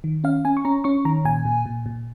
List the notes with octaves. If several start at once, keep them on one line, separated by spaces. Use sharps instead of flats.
D#3
C#4 F5
C#4 G#5
C#6
C#4 A#5
C#4 C#6
D#3 A#5
A#2 G#5
A#2
A#2
A#2